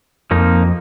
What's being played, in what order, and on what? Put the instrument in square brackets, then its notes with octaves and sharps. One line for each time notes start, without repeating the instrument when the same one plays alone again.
[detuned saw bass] F2 [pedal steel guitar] F3 A#3 D#4